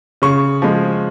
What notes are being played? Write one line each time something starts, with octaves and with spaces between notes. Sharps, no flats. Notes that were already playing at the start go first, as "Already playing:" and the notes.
C#3 C#6
F3 G#3